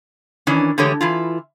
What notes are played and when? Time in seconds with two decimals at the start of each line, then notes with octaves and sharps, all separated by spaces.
0.47 D#3 E3 C#4 D4
0.78 D3 E3 G#3 A3 G4 C#5
1.01 E3 E4 F4